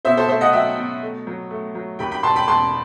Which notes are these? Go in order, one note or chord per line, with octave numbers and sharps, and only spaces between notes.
B2 C5 E5
A4 C5
A3 C5 E5
D#5 F#5
F#3 E5 G5
B2
A3
F#3
A3
F#3
D#2 G5 B5
G5 B5
E1 A5 C6
G5 B5
E1 A5 C6